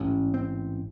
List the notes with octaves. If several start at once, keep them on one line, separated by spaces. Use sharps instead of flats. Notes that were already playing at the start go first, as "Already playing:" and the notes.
Already playing: A1 G#2 C#4
C4